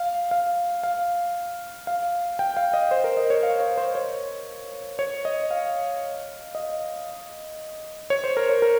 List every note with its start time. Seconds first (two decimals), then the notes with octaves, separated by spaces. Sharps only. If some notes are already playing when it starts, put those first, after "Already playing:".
Already playing: F5
0.31 F5
0.83 F5
1.87 F5
2.39 G5
2.57 F5
2.74 D#5
2.91 C5
3.04 A#4
3.17 D#5
3.30 C#5
3.43 F5
3.60 C#5
3.78 C5
3.95 C#5
4.99 C#5
5.25 D#5
5.51 F5
6.55 D#5
8.10 C#5
8.24 C5
8.37 A#4
8.49 C#5
8.62 A#4